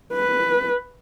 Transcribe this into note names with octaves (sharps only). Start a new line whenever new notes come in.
B4